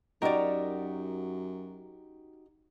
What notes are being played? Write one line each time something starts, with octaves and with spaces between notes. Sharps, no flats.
F#2 D#4 F#4 G4 A#4 D5